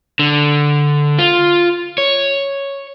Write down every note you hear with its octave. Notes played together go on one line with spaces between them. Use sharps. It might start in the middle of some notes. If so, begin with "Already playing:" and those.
D3
F4
C#5